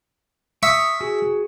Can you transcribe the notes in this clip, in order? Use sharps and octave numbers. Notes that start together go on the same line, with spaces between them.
E5 C#6 D#6 F6
F#4 G#4